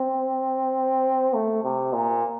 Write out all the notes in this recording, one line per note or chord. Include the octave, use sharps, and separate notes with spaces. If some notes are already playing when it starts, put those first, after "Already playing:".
Already playing: C4
A3
C3
A#2